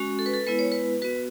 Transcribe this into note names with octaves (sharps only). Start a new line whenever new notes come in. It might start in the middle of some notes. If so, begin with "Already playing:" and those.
Already playing: G#3 C#4 F#4
A4
B4
A4
G#3 B3 E4 B4
C#5
B4
B3 F#4 B4